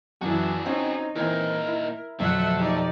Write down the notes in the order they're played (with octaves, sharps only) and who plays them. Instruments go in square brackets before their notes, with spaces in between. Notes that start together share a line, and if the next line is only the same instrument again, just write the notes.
[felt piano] F#2 E3 [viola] D4 E4 [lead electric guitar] F#4 G#4
[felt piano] C4 C#4 [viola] D#4
[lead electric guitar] A#2 D#4 [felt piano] E3 C4 [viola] A#4
[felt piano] E4
[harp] F2 B2 [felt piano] D3 F#3 [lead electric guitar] A3 [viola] E5 F#5
[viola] D#4 D5 [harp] G4